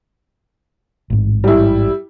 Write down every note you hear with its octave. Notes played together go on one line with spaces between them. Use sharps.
A1 G#2
G3 E4